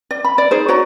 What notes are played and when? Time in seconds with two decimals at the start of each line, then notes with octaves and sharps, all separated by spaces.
0.11 D5
0.24 B5
0.38 D5
0.51 D#4 G#4 C5
0.68 F#4 C#5 D5 A#5